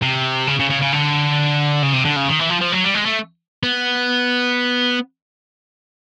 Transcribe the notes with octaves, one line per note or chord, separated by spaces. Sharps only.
C3
C#3
C#3
C#3
C#3
D3
C#3
C3
D3
C#3
D#3
E3
F3
F3
F#3
G3
G#3
A3
B3